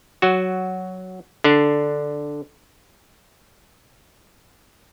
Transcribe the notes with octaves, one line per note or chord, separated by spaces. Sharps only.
F#3 F#4
D3 D4